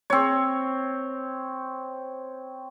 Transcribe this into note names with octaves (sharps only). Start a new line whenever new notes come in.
C4 C#5